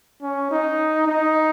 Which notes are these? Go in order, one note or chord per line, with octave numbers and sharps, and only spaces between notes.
C#4
D#4
D#4